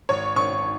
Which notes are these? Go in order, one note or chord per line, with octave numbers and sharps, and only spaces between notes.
G#1 C#5
G#1 C#6